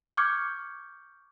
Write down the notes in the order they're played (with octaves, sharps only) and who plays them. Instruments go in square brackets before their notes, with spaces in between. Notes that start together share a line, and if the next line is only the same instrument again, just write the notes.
[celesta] C#6 D6 F6 G6 G#6 C#7